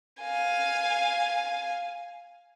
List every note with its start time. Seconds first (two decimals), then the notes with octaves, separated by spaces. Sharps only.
0.21 F5 G#5